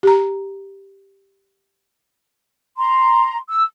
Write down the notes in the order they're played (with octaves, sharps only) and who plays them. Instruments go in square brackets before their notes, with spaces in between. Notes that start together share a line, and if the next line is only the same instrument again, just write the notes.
[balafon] G4 A#5
[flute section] A#5 C6
E6